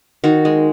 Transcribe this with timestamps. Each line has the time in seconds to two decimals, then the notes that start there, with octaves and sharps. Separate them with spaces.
0.24 D#3 F#4
0.45 G#3